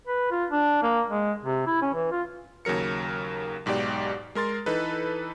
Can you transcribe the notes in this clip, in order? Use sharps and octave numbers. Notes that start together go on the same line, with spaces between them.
B4
F4
D4
A#3
G#3
C3
E4
C#4
E3
F4
D#2 C#3 F#3 A#4 C#7
B1 G#2 B2 G4 D5
G#3 A#4 C6 A6
E3 D#4 A4 B4